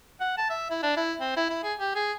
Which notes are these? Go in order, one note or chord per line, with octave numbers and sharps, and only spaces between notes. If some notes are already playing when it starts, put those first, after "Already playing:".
F#5
A5
E5
E4
D4
E4
C4
E4
E4
G#4
G4
G#4